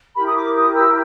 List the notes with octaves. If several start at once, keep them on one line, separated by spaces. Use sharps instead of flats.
E4 G4 A#4 B5
D#6
D6
D#6
E6